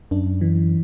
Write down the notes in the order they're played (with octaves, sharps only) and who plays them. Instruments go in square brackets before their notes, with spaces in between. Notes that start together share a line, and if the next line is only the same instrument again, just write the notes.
[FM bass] F#2 [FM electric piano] D4
[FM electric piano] E3